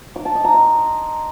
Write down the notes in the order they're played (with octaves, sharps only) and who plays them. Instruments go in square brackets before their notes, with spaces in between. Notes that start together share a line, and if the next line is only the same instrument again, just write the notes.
[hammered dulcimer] D6
A5
D#5
A#5
C6